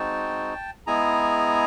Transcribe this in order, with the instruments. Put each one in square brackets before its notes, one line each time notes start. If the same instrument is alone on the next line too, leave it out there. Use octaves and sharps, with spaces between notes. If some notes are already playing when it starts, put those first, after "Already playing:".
Already playing: [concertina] G#3 C4 D#4 F#4 G5 A5
G#3 B3 E4 G#4 G#5 A#5